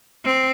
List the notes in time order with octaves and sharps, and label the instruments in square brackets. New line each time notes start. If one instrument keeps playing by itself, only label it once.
[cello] C4